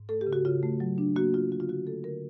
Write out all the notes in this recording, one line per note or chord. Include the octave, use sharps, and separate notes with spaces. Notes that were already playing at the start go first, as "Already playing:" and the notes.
Already playing: G#2
A3 A4
G4
C#3
F#4
C#3 F4
A3
F#3
D4
A#3 F#4
A#3 F4
D3 F#4
F4
D3 F#4
A3 A4
D3 A#4